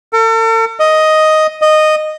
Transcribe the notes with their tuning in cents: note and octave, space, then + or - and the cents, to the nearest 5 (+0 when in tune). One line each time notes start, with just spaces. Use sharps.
A4 +45
D#5 +5
D#5 -10